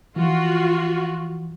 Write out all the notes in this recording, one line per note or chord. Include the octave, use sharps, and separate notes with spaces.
E3 F3 F4 F#4